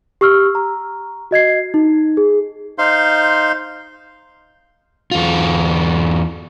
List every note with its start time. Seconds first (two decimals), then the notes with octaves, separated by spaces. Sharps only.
0.21 G4 C#6 E6 F6
0.55 A#5
1.31 F#4 D#5 G#6 C7
1.74 D#4
2.17 G#4
2.78 D#4 C5 F5 C6
5.11 E2 F4